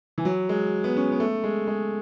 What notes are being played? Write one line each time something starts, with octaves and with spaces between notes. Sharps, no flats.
E3
F#3
G#3
B3
C#4
B3
A3
G#3
G#3